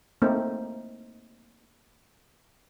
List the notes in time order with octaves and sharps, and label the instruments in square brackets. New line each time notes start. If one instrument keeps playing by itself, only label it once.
[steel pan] A3 A#3 C4 D#4